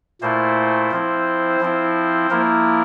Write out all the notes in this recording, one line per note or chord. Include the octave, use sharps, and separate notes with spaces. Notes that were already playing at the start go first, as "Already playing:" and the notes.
A#2 A3 E4 C5
F3 C4 E4
F3 C4 E4
F3 A#3 E4 A#4